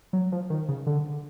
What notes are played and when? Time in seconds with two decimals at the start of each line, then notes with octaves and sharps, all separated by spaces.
0.13 F#3
0.32 F3
0.50 D#3
0.69 C#3
0.87 D3